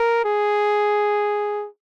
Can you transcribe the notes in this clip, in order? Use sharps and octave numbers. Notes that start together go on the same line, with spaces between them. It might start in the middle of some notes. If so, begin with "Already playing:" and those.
Already playing: A#4
G#4